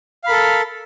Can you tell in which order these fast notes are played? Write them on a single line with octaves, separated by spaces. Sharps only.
F5 B5 A#4 A4